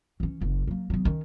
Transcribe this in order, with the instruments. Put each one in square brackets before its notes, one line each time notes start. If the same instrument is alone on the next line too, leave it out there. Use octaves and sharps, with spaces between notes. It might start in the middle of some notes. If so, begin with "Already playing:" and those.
[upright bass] E3 C#4
F#1
F#3 A#3
F#3 B3
D#3 C#4